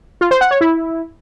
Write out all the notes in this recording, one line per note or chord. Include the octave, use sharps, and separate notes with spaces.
F4
C5
F#5
C#5
E4